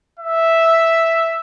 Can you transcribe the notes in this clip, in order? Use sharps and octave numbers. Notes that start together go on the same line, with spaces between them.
E5